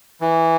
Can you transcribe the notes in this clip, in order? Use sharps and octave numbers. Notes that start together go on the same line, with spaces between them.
E3